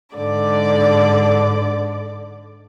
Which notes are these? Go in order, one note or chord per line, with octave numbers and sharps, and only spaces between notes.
G#2 D3 D5 D6